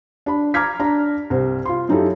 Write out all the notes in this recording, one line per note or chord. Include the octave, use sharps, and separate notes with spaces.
D4 B5
A#5 D6 F6 G#6 B6
D4 A#5
C2 C4
F4 C6
F#2 D#4 E4 G4 A4